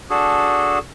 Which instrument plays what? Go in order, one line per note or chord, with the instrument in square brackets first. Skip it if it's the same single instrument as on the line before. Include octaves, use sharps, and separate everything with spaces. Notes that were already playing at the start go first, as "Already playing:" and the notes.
[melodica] D4 F#4 G#4 A4